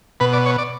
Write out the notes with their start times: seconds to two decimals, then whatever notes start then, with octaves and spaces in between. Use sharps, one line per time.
0.20 B2 B4
0.33 D5
0.46 C#5
0.58 D5